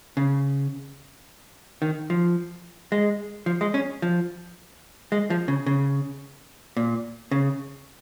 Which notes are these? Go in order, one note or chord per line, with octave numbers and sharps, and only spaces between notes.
C#3
D#3
F3
G#3
F3
G#3
C#4
F3
G#3
F3
C#3
C#3
A#2
C#3